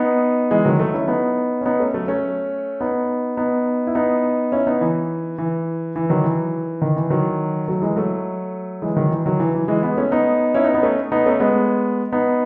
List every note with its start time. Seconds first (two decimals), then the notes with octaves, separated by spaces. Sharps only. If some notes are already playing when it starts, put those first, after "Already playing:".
Already playing: B3 D#4
0.51 E3 G#3
0.65 D#3 F#3
0.79 F#3 A3
0.94 C#4 E4
1.08 B3 D#4
1.61 C#4
1.65 B3 D#4
1.80 A3 C#4
1.94 F#3 A3
2.08 A3 C#4
2.80 B3 D#4
3.37 B3 D#4
3.87 E4
3.95 B3 D#4
4.52 C#4 E4
4.67 B3 D#4
4.81 E3
5.38 E3
5.96 E3
6.10 D#3 F#3
6.24 E3
6.82 D#3
6.96 E3
7.10 D#3 F#3
7.68 F#3 A3
7.82 E3 G#3
7.96 F#3 A3
8.82 E3 G#3
8.96 D#3 F#3
9.11 E3
9.26 D#3 F#3
9.40 E3
9.54 E3
9.68 E3 G#3
9.83 G#3 B3
9.97 A3 C#4
10.11 B3 D#4
10.55 C#4 E4
10.64 B3 D#4
10.74 B3 D#4
10.83 A3 C#4
11.12 B3 D#4
11.26 A3 C#4
11.40 G#3 B3
12.12 B3 D#4